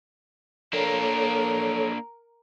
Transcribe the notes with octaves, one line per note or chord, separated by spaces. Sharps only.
A#3 D4 A4 A#4 C#5